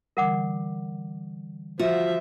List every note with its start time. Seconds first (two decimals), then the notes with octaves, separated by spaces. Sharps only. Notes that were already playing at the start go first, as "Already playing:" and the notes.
0.17 D3 E3 G3 A#4 F#5 D6
1.79 F3 F4 F#4 E5